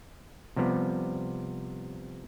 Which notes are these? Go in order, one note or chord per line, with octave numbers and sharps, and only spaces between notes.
C3 F3 G3 B3